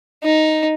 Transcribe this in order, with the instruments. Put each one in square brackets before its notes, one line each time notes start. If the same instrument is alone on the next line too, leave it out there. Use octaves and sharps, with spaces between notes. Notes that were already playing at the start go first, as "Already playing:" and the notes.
[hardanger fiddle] D#4